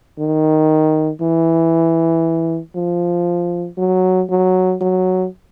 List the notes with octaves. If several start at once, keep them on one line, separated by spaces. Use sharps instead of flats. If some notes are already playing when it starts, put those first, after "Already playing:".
D#3
E3
F3
F#3
F#3
F#3